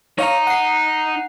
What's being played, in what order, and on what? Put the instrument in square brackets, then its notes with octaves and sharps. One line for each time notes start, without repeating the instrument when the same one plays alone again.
[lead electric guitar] D#4 A#5 [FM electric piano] C#5 F5
[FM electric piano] F#5 C7